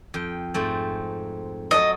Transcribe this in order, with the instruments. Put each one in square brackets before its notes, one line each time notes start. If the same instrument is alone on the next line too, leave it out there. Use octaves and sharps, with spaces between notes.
[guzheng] F2 G5
G#2 A3 C4
[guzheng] F#3 A4 [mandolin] D#5